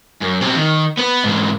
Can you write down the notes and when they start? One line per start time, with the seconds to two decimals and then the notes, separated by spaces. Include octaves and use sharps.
0.21 F#2
0.41 B2 C4
0.56 D#3
0.97 B3 B4
1.24 G#2 E3